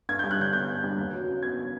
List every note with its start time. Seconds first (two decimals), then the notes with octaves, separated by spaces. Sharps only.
0.09 G2 G#6
0.19 G3 G6
0.31 F#6
0.39 D3 G6
0.53 B3 G6
0.68 G2
0.84 G3
0.98 D#2
1.13 F#3
1.28 C#3
1.42 B3 G#6